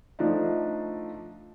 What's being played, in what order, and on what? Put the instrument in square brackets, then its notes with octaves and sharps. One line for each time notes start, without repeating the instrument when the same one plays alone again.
[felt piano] F3 A3 D4 D#4